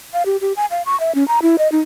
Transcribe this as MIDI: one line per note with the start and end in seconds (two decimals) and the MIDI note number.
0.14 0.23 77
0.26 0.37 67
0.41 0.53 67
0.56 0.66 80
0.71 0.82 77
0.86 0.98 85
1.00 1.14 76
1.15 1.26 61
1.28 1.39 82
1.42 1.56 64
1.58 1.70 75
1.72 1.80 63